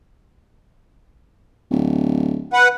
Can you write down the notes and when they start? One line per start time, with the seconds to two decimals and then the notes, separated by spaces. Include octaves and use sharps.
1.70 D1
2.53 B4 F#5